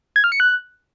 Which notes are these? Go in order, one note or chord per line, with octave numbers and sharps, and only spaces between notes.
G#6
F6
C#7
F#6